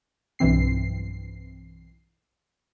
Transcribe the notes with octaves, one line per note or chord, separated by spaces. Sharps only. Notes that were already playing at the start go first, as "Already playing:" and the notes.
B1 G2 E3 C4 C7